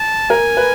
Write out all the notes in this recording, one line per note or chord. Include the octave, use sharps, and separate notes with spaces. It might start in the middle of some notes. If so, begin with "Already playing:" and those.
Already playing: A5
A#4 G#5
B4